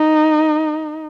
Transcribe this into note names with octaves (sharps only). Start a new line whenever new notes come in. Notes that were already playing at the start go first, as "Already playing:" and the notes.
Already playing: D#4